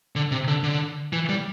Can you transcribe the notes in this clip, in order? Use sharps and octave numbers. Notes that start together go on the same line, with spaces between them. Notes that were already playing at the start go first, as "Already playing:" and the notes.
D3
C3
D3
D3
E3
G3